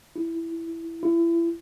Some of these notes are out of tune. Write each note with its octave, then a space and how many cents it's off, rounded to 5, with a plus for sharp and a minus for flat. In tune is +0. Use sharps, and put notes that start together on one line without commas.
E4 +5
E4 +30